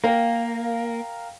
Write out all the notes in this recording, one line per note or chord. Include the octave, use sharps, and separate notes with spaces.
A#3 A#4 F5 G5